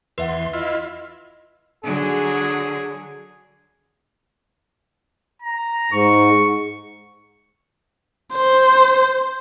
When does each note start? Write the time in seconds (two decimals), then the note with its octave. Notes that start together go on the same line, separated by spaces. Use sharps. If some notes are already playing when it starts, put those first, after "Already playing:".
0.18 E2 B4 E5 F#5 C6
0.53 E4 F4 D#5
1.84 D3 F#3 G#4
5.42 A#5
5.92 G#2 C#6
8.35 C5